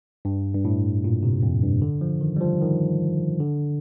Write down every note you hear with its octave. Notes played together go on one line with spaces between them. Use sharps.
G2
G2
A2
A#2
C3
F2
G2
D3
F3
D#3
G3
F3
D#3
D3